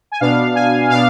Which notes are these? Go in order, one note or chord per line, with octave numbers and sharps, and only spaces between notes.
G#5
B2 B3 D4 F5
G#5
B2 B3 D4 F5